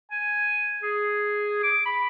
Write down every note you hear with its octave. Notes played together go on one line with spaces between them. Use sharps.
G#5
G#4
D6
B5